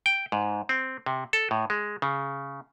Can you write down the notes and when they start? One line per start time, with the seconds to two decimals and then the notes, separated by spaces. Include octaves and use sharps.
0.06 G5
0.32 G#2
0.69 C4
1.06 C3
1.33 A4
1.51 A2
1.70 G#3
2.02 C#3